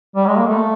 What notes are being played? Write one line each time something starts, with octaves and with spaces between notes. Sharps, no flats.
G3
G#3
A#3
A3